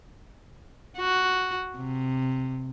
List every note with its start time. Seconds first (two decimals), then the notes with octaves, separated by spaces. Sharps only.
0.98 F#4
1.77 C3